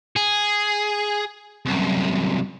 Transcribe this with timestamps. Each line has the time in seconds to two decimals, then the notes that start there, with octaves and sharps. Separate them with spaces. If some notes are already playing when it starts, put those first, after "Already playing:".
0.16 G#4
1.66 C2 F#2